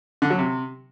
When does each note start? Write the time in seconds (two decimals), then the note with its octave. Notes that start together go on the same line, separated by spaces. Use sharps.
0.22 D3
0.30 F#3
0.39 C3